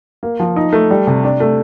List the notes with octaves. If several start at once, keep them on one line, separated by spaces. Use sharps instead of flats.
A#3
F3
D#4
A3
G3
C3
D4
A3